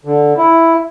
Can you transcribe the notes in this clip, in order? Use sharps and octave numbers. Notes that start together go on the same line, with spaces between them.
D3
E4